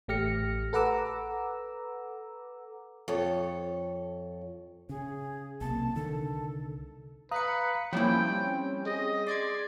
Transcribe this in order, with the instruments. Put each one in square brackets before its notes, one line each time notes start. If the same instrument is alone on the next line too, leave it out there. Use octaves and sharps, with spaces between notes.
[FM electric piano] A1 A3 G4 F6 A#6 C#7
A4 B4 F#5 A#5 D6 E6
[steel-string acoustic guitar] F2 A4 C#5
[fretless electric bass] C#3 [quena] G#4
[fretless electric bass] B1 C3 A#3 [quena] A5
[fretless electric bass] C2 D3 D#3 [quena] A4
[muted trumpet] B4 [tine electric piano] F5 A#5 D#6 [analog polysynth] F#6 C#7
[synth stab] F3 A#3 E4 [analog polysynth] G3 C4 C#4 [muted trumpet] G5 [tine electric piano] B5
[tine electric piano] G#4 [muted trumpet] D#5
[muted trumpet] D5 [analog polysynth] C6 D6 G#6